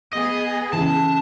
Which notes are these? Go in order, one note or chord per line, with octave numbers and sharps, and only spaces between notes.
B3 G#4 D#5
C#3 E3 A5